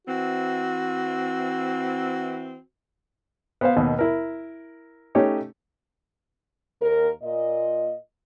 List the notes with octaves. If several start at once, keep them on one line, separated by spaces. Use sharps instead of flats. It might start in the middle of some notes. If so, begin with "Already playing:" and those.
E3 C4 F#4
B3 C5 F5
D#2 B2 D#3
E4 A#4
A3 C#4 D#4 G4 C#5
D#2 A#4
A#2 D#5